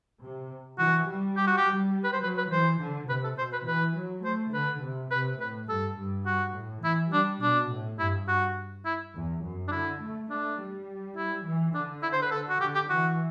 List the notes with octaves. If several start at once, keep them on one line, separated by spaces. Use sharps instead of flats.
C3
E3 F#4
G3
G4
F#4
G4
G3
B4
C5
F#3 B4
B4
E3 C5
D3
C3 B4
A4
B2 C5
B4
E3 B4
F#3
A3 C5
D3 B4
C3
C3 B4
A2 B4
G2 A4
G2
F#4
A2
E3 E4
G3 D4
B2 D4
A2
G2 E4
F#4
E4
E2
F#2
D4
D3 E4
A3
A3 D4
G3
E4
E3
D3 D4
E4
C5
B4
A4
F#4
D3 G4
G4
E3 F#4